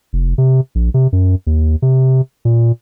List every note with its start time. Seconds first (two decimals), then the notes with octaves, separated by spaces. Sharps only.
0.13 F1
0.38 C3
0.75 A#1
0.94 C3
1.13 F#2
1.47 D#2
1.82 C3
2.45 A#2